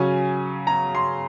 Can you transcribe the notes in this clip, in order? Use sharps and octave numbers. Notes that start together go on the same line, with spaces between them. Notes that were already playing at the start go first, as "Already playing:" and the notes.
Already playing: C#3 F#3 C#4 G#5
A#5
C6